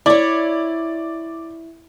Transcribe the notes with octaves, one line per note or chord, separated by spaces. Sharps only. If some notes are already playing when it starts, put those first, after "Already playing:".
E4 C#5 D5